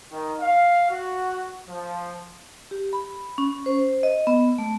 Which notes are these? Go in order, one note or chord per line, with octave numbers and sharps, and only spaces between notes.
D#3
F5
F#4
F3
G4
B5
C#4
C5
D#5
B3
A3